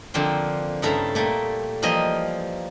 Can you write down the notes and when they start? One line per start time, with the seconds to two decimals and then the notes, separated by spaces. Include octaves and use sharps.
0.14 D3 F3 A#3 C4
0.82 G2 C#3 A3 E4 A4 A#5
1.15 A#2 G3 A3 A#3
1.82 E3 F3 G3 A#3 D#5